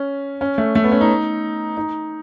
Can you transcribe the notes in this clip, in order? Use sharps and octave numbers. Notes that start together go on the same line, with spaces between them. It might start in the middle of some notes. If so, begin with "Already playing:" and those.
Already playing: C#4
C#4
A3
A3
B3
C#4
D#4
D#4